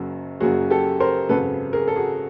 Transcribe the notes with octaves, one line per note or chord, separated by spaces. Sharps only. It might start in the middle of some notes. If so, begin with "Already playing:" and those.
Already playing: F#1 F#2 C#3 F#3 A#3 F#4
F#1 F#2 C#3 F#3 A#3 F#4 G#4
G4 A4
A#4 C5
G#1 F#2 C#3 A4 B4
G#4 A#4
A4
F#4 G#4